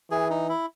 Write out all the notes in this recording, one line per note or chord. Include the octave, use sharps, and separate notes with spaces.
E3 G#4
D#4
E4